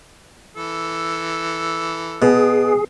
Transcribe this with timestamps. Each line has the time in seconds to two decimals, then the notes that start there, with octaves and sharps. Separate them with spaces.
0.56 E3 A4
2.22 B2 G#4